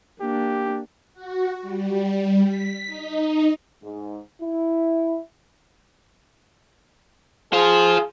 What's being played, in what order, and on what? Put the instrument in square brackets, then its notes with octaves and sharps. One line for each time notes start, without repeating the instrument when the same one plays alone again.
[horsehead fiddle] A#3 D4 [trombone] G4
[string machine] F#4
G3
B6
D#4
[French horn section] G#2
E4
[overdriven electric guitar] F4 C5 [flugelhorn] G#4